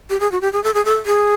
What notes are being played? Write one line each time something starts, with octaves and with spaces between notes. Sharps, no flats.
G4
G#4
F#4
G4
G#4
A4
G#4
A4
G#4